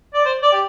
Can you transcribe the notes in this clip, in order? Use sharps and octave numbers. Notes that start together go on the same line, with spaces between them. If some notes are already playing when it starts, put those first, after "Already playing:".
D5
C5
D5
G4